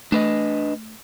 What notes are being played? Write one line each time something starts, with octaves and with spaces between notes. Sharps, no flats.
A3 D4 B4 D#5